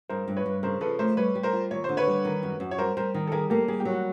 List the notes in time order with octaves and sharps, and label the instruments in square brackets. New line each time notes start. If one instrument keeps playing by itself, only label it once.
[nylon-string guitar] G2 [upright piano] A#4 C5
[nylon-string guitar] G2
[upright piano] B4 C#5
[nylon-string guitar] G2
[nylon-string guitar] C#3 [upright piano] A#4 C5
[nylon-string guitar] F3 [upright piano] A4 B4
[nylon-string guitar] A3 [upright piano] A#4 C5
[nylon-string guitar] G3 [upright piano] B4 C#5
[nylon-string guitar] G3
[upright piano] A#4 C5
[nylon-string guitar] F4
[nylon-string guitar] D#2 [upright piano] C#5
[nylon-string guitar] D3 [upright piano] C5
[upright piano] B4 C#5
[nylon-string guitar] G3
D#3
F#2
F#2
[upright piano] C#5
[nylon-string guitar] G3 [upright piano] A#4 C5
[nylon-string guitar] G3 [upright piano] A#4 C5
[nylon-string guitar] D#3
[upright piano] A4
[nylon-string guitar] G3 [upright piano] G#4 A#4
[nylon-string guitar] A#3 [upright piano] G4 A4
[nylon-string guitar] G3 [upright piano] G#4
[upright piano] G4
[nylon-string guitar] F#3
[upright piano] F#4